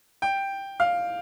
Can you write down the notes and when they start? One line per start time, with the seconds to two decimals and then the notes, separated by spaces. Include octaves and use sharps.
0.22 G5
0.80 F5